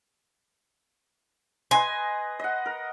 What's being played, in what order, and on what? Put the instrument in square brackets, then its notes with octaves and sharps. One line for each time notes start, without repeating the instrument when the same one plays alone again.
[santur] B4 D#5 C6 [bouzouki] G#5
[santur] D#5 F#5
A#4